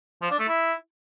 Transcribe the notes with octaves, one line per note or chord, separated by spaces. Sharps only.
F3
D4
A3
E4